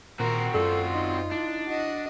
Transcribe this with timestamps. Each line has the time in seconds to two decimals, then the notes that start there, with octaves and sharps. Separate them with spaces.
0.20 A#2 D#3 C4 F#4 A#4
0.54 F#2 F4 A4 D5
0.94 D#4
1.32 D4 E4
1.67 F#4 D#5